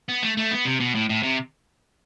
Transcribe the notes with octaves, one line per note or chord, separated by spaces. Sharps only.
B3
A3
A3
B3
C3
B2
A2
A2
C3